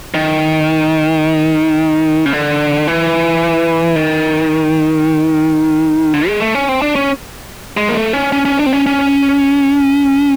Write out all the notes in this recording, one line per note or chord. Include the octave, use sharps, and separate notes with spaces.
D#3
C#3
D3
E3
D#3
D3
G#3
A3
C#4
C4
D4
C#4
G#3
A#3
A3
C#4
C#4
C#4
D4
C4
C#4
C#4